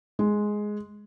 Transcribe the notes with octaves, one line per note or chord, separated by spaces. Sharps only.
G#3